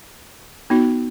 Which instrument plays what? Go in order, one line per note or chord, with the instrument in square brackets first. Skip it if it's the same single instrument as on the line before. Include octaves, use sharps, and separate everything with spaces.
[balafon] B3 D#4 F#4